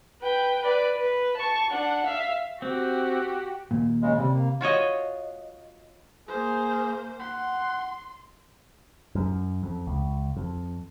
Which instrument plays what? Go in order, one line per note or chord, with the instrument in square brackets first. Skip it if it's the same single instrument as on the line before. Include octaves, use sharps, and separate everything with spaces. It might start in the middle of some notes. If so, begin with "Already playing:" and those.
[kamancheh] B4 G5
B4 D5
B4
A5 C#6
D4 F#5
E5 F5
[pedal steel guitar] C4 [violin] F#4 G4
[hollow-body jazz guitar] D#2 A#2
[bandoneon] C#3 G#3
[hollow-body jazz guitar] C3 [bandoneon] G3
[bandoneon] A#3
[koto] F4 F#4 C#5 D#5
[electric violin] A#3 C5 [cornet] G#4
[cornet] F#5 [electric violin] C6
[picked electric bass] F#2
F2
C#2
F2